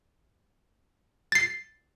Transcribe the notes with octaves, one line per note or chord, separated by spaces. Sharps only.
A6 C7